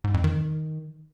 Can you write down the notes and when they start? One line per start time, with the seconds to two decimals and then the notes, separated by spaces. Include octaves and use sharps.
0.04 G#2
0.14 F2
0.24 D#3